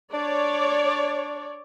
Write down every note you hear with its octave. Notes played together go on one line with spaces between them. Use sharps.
D4 C#5 D5